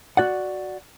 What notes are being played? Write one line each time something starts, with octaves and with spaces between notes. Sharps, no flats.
F#4 D5 F#5